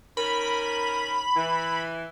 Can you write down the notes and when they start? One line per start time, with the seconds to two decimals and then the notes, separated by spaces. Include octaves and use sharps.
0.17 D#3 C#4 A#4 B5
1.36 E3